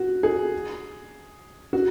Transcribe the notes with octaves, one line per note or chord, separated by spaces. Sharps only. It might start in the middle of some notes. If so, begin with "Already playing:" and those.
Already playing: F#4
G#4
F#4